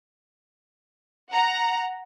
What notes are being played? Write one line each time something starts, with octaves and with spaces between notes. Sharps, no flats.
F#5 A#5